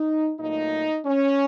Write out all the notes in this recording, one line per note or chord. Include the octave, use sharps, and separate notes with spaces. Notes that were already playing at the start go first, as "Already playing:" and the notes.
Already playing: D#4
A#2 F#3 A3 D#4
C#4